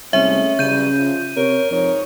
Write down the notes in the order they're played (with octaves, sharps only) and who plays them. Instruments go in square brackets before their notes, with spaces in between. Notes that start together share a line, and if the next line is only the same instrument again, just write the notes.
[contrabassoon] C2 [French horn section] G#3 A3 [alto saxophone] C#4 [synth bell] E5
[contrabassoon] C#3 [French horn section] E3 F#3 G3 [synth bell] G6 D#7
[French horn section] F3
[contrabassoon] C3 [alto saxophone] A#4 [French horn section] C#5
[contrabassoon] F2 [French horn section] G#2 D#4 C#5